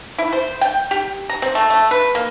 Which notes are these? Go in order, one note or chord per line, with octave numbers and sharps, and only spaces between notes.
E4
C5
G5
G4
A#5
C4
A3
A3
B4
A#3